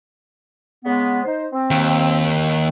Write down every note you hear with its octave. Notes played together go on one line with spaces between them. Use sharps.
C#3 G#3 B3
D#4 C5
C4
D#2